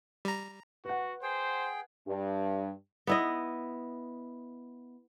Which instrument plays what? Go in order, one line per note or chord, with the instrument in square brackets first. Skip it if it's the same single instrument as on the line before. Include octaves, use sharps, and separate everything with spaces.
[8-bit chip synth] G3 A#5
[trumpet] F#4 [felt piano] B4 F#5
[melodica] G#4 G5 [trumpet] C5
[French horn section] G2
[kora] B3 E4 D#5